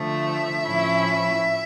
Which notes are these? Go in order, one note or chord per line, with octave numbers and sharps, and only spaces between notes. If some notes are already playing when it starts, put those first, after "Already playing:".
Already playing: D3 F3 A3 E5
A2 F3 C#4 E4